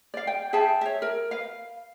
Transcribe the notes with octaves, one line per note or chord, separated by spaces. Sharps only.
D5 F5
G5
G#4 E5 G5 A5
C#5 E5
A#4
B4 F5